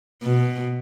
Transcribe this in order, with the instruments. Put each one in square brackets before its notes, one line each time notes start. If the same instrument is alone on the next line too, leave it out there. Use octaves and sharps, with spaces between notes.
[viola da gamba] B2